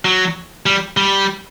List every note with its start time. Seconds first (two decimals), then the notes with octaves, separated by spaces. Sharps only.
0.05 F#3
0.66 G3
0.97 G3